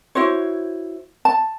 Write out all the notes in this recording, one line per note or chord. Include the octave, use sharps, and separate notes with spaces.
E4 F#4 C5 C#5
A5